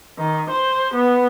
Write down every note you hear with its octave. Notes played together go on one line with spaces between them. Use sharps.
D#3
C5
B3